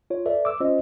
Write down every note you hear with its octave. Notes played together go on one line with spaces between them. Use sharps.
F4 C#5
A4 B4 D5 E5
D6 E6
C#4 F4 C5 D#5